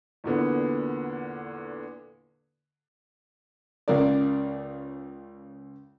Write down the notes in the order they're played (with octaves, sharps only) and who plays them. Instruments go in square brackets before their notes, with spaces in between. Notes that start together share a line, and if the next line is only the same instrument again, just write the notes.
[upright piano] E2 A#2 D3 B3
[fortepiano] C#2 C#3 A#4 D5